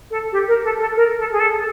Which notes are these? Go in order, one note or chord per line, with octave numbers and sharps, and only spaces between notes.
A4
G4
A#4
A4
A4
A#4
A4
G#4
A4